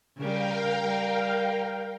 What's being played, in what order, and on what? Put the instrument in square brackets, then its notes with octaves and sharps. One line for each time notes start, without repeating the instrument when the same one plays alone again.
[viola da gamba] C#3 G3 [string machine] A#4 F5 G5
[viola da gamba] G3